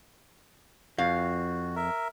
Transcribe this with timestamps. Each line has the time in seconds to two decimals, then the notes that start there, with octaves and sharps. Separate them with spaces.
0.98 F2 F#4 F5
1.76 A#4 E5